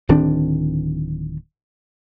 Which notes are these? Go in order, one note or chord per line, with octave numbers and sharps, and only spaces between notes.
D1 D#3 C4 D4